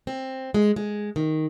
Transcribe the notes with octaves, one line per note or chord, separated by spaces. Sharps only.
C4
G#3
G#3
D#3